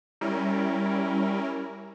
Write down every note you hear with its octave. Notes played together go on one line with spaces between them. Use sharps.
G3 C#4 E4 A#4